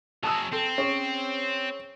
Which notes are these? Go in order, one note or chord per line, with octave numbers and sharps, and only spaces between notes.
F#3 G#4 A5 D#6 E6
C4 A4
C#4 G#4